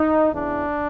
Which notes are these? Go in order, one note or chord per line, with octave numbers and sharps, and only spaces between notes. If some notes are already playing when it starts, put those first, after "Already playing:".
Already playing: D#4
E2 C#3 E3 D4